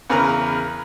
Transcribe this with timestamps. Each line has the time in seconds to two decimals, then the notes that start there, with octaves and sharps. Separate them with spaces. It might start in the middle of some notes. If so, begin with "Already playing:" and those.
0.10 E2 C#3 A#4 B4 A#5